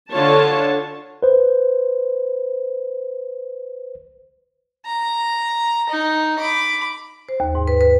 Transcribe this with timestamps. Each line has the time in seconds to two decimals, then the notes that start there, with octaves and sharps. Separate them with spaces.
0.11 D3 F4 C#5 A5
1.23 B4 C5
4.86 A#5
5.89 D#4
6.39 B5 D6
7.29 C5
7.40 D#2
7.55 G#2
7.67 B4
7.81 B4